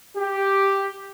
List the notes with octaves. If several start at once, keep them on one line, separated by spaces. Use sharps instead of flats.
G4